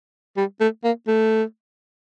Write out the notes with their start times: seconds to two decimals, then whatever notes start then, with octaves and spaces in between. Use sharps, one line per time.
0.37 G3
0.61 A3
0.84 A#3
1.08 A3